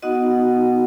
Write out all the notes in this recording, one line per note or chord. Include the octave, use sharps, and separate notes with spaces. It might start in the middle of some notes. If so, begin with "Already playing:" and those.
B3 D#4 F#4 D#5 F#5